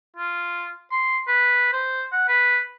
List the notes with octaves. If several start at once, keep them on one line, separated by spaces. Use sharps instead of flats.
F4
C6
B4
C5
F#5
B4